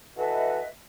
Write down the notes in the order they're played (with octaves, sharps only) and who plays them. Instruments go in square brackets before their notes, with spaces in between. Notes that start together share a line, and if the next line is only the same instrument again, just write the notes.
[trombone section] E3 F#4 A4 [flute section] B4 D#5 E5